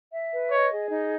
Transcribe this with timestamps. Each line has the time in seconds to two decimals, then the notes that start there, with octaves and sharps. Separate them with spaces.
0.12 E5
0.31 B4
0.51 C#5 D#5
0.71 G#4
0.91 D#4